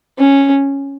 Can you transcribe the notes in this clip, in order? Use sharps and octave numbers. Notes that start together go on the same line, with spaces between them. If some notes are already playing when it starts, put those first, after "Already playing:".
C#4